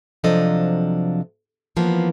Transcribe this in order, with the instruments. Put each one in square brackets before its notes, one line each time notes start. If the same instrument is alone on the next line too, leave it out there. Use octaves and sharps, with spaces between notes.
[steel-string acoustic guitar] C3 F3 F#3 D4 A4 D#5
E3 F3 A#3 B3